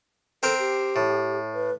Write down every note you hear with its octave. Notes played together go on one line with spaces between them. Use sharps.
C4 A4 A#4 C5
G4
A2
B4